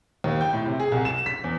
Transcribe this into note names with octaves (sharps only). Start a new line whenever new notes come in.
D#2
G5
A2
C3
G#4
C2
E7
B6
E2